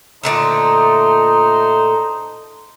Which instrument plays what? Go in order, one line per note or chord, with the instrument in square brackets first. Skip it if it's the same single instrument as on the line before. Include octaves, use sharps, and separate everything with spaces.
[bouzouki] A#2 D3 A3 [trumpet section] D#4 C5 A#5